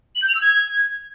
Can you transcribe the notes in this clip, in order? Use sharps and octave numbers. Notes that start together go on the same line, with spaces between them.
F#7
G6
F7
E6
G#6